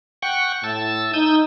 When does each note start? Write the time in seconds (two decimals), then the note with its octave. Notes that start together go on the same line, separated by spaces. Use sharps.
0.23 F#5 G5 C#6
0.64 A2 A5 E6
1.14 D#4 D#6 E6 G6